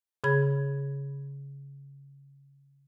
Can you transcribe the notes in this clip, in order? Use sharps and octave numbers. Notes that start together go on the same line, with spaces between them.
C#3 G#4 B5 G#6